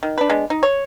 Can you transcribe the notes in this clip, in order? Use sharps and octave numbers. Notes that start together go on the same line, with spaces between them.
D#3
D4 B4
G#3 B3 D4
D#4
C#5